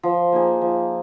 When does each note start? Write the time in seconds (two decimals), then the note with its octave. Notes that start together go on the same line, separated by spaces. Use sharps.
0.03 F3
0.32 A#3 D#4 G#4
0.61 F3